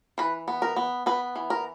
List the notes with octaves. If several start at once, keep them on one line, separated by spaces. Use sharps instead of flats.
E3 B4
B3
A#4
B3
B3 B4
E3
A#4